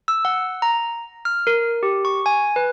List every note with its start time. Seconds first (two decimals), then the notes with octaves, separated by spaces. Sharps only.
0.08 E6
0.25 F#5
0.62 A#5
1.25 F6
1.47 A#4
1.83 G4
2.05 C#6
2.26 G#5
2.56 B4